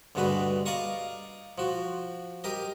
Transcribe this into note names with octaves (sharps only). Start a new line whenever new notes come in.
D2 G2 D3 G#3 F#4 B4
D5 D#5 F5 A#5 C#6 D#6
F3 F#4
G4 A#4 D#5